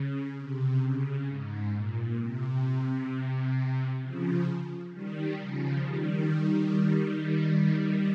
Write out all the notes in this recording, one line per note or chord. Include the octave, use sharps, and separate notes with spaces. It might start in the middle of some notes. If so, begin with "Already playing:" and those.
Already playing: C#3
C3
C#3
G#2
A#2
C3
C#3 F3
D#3 G3
C#3 F3
D#3 G3